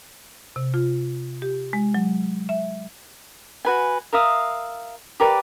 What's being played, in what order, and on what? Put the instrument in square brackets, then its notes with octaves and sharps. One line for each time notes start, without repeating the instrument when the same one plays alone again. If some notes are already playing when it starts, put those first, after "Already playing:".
[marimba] C3
F4
G4
G#3
F#3
E5
[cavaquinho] F#4 B4 G#5
A#4 E5 F5 D#6
G4 A#4 B4 D5